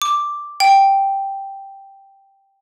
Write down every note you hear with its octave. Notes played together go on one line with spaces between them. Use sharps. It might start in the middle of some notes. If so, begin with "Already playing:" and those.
D6
G5